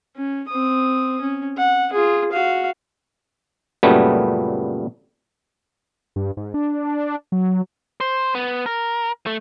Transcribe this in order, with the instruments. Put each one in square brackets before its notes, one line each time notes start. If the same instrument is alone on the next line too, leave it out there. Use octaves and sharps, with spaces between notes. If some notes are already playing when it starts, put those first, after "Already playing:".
[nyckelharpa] C#4
C4 D#6
C#4
F#5
F4 G#4
F#4 F5
[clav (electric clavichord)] F#2 A#2 C#3 G3 A3 B3
[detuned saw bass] G2
G#2
D4
F#3
[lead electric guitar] C5
B3
A#4
A3